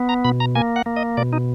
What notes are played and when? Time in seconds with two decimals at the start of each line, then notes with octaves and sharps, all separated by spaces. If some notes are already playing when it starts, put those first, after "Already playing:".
Already playing: B3
0.09 A#5
0.25 B2 B5
0.40 A#5
0.55 A#3 G#5
0.76 F#5
0.86 A#3
0.97 D#5
1.17 B2 D5
1.33 D#4